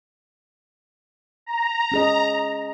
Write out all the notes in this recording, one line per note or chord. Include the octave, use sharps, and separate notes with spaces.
A#5
C#4 G#4 D#5